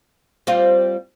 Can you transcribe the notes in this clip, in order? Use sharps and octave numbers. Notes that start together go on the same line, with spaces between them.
G3 C4 F4